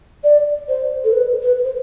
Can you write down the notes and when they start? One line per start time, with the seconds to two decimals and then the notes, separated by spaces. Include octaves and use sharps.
0.24 D5
0.68 C5
1.04 A4
1.13 B4
1.42 B4
1.65 C5